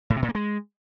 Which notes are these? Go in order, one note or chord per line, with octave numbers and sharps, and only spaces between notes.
A2
C3
A#2
A#3
G#3